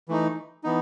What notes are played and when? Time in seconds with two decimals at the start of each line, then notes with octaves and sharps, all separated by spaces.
0.09 E3 A3 D#4
0.64 E3 B3 D#4